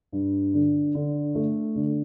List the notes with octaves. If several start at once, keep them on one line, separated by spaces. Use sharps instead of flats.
G2
D3
D3
A3
D3